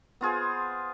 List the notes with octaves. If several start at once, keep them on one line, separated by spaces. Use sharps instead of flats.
B3 F4 G#4 C5